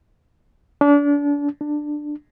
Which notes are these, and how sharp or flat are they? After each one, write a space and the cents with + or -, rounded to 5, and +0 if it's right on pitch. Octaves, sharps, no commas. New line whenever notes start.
D4 -30
D4 +15